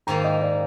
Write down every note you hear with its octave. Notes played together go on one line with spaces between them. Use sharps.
G#2 D#3 A#3 G5 A#5
D#5 G5
D5 F5